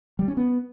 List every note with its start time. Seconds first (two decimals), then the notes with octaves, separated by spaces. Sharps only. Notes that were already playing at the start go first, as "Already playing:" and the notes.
0.19 G3
0.28 C#4
0.37 B3